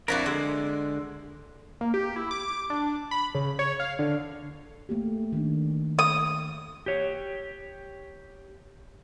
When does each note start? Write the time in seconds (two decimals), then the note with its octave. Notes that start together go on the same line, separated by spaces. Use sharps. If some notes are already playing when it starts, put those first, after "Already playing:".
0.08 F2 D4 E4 F#4 A#4 D5
0.26 D3 G#3
1.81 A#3
1.94 G4
2.16 E4
2.31 D6
2.70 D4
3.11 B5
3.35 C#3
3.59 C#5
3.80 F5
3.99 D3
4.89 A3 A#3 G4
5.33 D#3 D4
5.99 D#6
6.86 G4 C#5